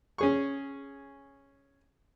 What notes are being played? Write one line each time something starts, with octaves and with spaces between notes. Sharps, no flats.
C#4 G#4 C#6